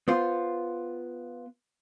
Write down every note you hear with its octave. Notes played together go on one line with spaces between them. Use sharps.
B3 F4 C5